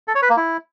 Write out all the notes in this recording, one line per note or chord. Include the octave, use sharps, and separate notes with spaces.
A4
C#5
B4
A#3
E4